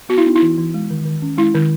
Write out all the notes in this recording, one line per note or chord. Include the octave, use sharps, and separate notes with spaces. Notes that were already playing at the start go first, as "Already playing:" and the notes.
B3 F#4
E4
B3 D#4
E4
E3
E3
G#3
D#3
D#3
C#4
G#3 E4
D#3